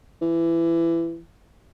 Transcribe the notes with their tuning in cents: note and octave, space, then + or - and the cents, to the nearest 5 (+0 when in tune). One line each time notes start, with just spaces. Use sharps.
E3 +20